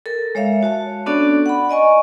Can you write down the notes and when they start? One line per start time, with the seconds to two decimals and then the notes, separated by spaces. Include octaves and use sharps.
0.06 A4 A#4
0.35 G#3 C#5 E5 F5
0.63 F#4 C#5 A5
1.06 B3 C#4 D4 F#4 A4 D5
1.46 F#5 B5
1.69 D5 D#5 G#5 C#6